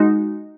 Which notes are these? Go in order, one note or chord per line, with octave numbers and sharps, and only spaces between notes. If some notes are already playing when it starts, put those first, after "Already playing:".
Already playing: G#3 D#4 F#4